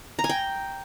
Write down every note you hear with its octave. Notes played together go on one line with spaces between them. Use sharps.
A#5
G#5
G5